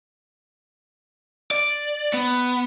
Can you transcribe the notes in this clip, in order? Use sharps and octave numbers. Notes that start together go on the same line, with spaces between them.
D5
B3